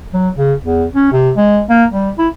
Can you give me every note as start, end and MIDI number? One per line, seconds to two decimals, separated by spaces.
0.13 0.29 54
0.37 0.54 49
0.63 0.85 40
0.95 1.10 61
1.12 1.31 48
1.36 1.61 56
1.69 1.85 58
1.92 2.10 55
2.18 2.28 64